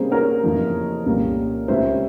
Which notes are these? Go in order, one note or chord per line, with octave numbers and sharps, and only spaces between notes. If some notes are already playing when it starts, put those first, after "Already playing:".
Already playing: C3 G3 A#3 C#4 G#4 C5
A#4 C#5
F2 C#3 E3 G3 A#3
C2 A#2 G3 A#3 C#4
C#2 C3 G3 C#4 C5 E5